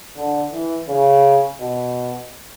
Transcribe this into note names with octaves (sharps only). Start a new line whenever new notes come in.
D3
E3
C#3
B2